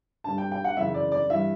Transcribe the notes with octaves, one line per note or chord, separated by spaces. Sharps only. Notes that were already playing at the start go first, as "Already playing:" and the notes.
G2 D3 A5
G5
G5
F#5
F#2 C#3 E3 E5
D5
D5
G2 E3 E5